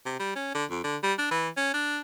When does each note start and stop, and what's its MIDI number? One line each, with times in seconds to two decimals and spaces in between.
0.06 0.17 48
0.20 0.33 55
0.36 0.50 61
0.55 0.65 50
0.70 0.84 41
0.84 0.97 50
1.03 1.14 55
1.19 1.28 62
1.31 1.49 52
1.57 1.74 61
1.74 1.99 62